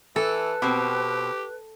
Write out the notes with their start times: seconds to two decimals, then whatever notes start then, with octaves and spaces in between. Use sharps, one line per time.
0.16 E3 A4 B4
0.62 B2 C4 G4